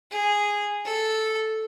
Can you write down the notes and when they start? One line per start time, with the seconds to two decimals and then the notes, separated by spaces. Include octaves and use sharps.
0.11 G#4
0.85 A4